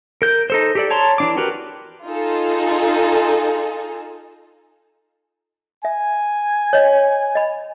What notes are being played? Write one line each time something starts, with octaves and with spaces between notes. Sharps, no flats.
A#4 G6
D#4 A4 C5
G4 A4 D5
C#5 A5 A#5 C6
E3 D4 D6
F#4 G4 A#4 B4
D#4 F4 G#4 A4
E5 G#5
C#5 D#5
D#5 B5